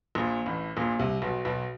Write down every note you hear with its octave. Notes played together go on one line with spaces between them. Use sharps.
A#1 A#2
A1 A2
A#1 A#2
C2 C3
B1 B2
B1 B2